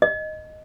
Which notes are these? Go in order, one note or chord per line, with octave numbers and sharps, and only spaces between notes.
D#5